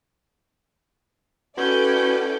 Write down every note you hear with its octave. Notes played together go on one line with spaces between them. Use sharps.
C#4 E4 F#4 A4 B4 D5 G5